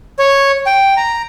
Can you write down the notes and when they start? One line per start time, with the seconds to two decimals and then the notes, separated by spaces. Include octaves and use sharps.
0.19 C#5
0.66 G5
0.97 A#5